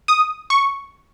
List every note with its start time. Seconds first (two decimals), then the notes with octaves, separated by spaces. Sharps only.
0.08 D#6
0.50 C#6